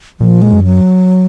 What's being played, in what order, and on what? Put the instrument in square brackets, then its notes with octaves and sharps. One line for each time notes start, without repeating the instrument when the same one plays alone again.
[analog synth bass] A#2 [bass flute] F3
[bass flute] G#3
[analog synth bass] F#2
[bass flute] F#3